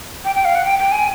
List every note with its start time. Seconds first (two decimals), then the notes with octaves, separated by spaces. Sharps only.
0.25 G5
0.35 G5
0.45 F5
0.55 F#5
0.65 G5
0.79 G5
0.92 G#5